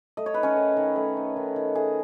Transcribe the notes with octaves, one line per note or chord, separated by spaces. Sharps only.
A3 D#5
C#5
D#4 B4
C#4 C#5
D#3
D#3
A3
D#4
D#3
D#3
A3 G#4